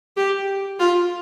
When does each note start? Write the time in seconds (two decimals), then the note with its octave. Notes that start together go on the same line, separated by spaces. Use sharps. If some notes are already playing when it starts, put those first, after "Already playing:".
0.17 G4
0.79 F4